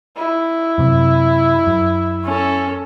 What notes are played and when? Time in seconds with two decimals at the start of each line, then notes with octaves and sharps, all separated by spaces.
0.17 E4
0.78 F#2 C3
1.67 F#2
2.25 C#4 A4